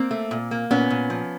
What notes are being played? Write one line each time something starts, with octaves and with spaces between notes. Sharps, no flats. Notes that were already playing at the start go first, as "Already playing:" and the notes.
Already playing: A#3 C4
A3
A#2
A#3
A#2 B3 C#4
A#2
F3